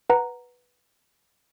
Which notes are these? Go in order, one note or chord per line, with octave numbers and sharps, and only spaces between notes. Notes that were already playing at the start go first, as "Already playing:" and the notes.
B4 F#5 A#5